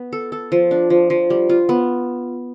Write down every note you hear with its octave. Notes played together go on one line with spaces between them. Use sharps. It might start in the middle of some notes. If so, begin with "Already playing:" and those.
Already playing: B3
A4
A4
F3
D4
F3
F3
G3
F4
B3